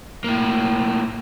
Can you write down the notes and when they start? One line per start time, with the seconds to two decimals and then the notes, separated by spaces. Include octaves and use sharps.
0.24 A2 A#3